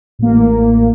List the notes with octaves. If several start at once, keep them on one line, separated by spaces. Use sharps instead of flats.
A1 A#3